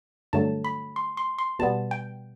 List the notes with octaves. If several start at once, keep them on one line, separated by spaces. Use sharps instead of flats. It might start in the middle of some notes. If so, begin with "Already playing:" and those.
G2 D3 F#3 A3 A5
B5
C6
C6
C6
B2 G3 B3 A5
G5